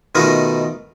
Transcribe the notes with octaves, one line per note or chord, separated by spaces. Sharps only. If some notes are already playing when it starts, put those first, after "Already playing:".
B2 D#3 A3 D#4 F4 A#4